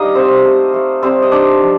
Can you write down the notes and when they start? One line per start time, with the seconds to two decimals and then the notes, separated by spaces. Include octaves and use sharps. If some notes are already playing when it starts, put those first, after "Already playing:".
Already playing: G3 A3 D4 D#4 G4 D#5 F5
0.15 C4 F4 C5
0.44 A3
0.74 A3
1.02 G3 C4 C5
1.22 D#5
1.32 D4 D#4 D5
1.61 F3